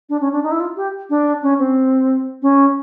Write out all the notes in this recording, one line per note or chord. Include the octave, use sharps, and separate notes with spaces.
D4
C#4
D4
D#4
E4
F4
G4
D4
C#4
C4
C#4